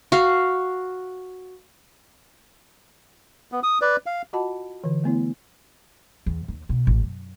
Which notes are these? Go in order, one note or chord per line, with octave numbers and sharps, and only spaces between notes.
F#4 F5
B3
D#6
B4 D5
F5
F4 F#4 D#5 F#5 A5 B5
D3 E3
A3 B3 E4
E2
D#2
B2
A1
F#2